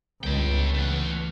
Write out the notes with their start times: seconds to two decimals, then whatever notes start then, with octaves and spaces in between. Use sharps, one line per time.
0.23 G1 C#2 C#3 B3 C#5 G5
0.74 E3 A3 F#5